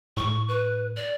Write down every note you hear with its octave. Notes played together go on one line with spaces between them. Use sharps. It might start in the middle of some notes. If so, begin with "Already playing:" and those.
A2 C#6
B4
D5